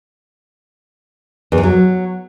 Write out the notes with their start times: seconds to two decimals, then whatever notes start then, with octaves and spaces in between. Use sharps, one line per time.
1.52 E2
1.58 E3
1.63 F#3